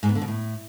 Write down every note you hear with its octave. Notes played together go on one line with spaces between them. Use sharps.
G#2
B3
D3
B2
A2